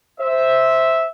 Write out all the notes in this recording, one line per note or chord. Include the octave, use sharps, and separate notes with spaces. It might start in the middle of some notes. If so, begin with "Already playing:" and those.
C5 E5